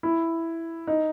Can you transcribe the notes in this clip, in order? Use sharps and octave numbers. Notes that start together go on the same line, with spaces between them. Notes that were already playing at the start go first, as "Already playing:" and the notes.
E4
D#4